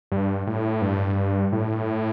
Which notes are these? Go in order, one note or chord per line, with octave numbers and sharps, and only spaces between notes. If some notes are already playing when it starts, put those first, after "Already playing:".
G2
A2
G2
A2